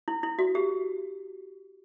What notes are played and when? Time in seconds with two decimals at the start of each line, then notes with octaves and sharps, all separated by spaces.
0.08 E4
0.23 E4
0.39 F#4
0.55 G4